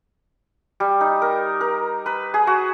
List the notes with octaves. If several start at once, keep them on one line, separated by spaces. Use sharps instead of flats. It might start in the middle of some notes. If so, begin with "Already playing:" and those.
G3
D#4
A#4
A#4
B4
G#4
F#4